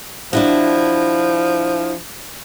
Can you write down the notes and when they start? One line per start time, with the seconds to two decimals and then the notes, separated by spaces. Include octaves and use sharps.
0.33 F3 D4 E4 F#4